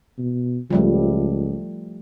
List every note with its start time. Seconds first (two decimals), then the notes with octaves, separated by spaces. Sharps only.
0.18 B2
0.70 C#2 F3 G3 A3